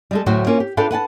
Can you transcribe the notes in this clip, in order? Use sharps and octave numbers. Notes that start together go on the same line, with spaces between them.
G3 G#3 A4
D2 A2 F#3 F#4 C5 G5
A#3 C#4 F4
G4
D4 F4 A4 B4 F5 G5
B4 F#5 G#5 A5